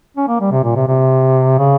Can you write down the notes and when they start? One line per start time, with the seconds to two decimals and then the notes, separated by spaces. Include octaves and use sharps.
0.17 C#4
0.28 A#3
0.41 G3
0.51 C3
0.63 A#2
0.76 C3
0.87 C3
1.58 C#3